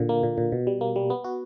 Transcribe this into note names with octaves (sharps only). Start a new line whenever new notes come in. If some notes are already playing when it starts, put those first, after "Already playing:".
Already playing: A#2 D3
A#3
A#2
A#2
B2
G3
A#3
G3
B3
F#4